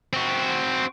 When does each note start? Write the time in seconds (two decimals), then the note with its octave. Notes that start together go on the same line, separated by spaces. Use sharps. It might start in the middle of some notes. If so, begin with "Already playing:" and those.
0.13 C4 F#4